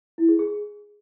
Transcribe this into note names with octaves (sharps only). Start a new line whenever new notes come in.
E4
G#4
G#4